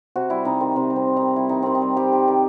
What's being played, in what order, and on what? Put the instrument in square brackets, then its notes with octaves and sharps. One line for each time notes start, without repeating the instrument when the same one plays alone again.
[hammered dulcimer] C3 F#4
G3 E4
C3 D#4
D#3 C4
C3
G3
C4
C3
D#3 D#4
G3 E4
D#3 D#4
D#3 C4
D#4
G3
G3 G4
D#3
D#3